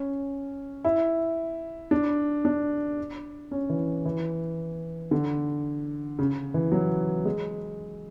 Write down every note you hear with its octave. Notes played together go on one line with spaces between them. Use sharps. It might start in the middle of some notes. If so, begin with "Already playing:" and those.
Already playing: C#4
E4
D4
D4
C#4
E3
E3
D3
C#3
E3
F#3
G#3